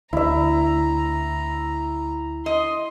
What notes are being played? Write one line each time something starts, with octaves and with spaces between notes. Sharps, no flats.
D2 E4 E5 A#5
D#5 C6